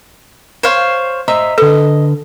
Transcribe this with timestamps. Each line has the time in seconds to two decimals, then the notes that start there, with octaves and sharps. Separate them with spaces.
0.63 C5 C#5 F5
1.28 C5 D#5 E5 A#5
1.58 D3 A4 B4 D#5